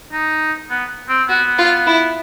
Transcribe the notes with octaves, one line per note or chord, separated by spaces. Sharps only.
D#4
B3
C4
B3 F#4
F4
E4